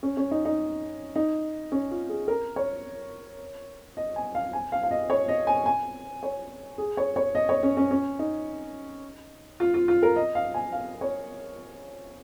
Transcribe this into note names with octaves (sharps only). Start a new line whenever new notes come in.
C#4
C#4
D#4
D#4
D#4
C#4
F4
G#4
A#4
C#5
D#5
G#5
F5
G#5
F5
F5
D#5
C#5
D#5
G#5
G#5
C#5
G#4
C#5
C#5
D#5
C#5
C#4
C#4
C#4
D#4
F4
F4
F4
A#4
D#5
F5
G#5
F5
C#5